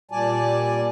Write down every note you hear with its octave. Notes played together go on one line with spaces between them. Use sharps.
A#2 G3 D5 G#5 A5